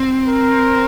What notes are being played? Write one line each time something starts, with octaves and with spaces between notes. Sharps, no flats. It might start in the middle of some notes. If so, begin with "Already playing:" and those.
Already playing: C4
A#4